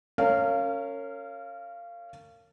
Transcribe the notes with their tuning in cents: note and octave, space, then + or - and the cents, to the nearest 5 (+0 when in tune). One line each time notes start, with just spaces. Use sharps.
C#4 +0 A#4 -35 F5 -15